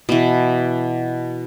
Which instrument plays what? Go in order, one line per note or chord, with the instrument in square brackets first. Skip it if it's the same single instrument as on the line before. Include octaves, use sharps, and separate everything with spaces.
[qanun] B2 E3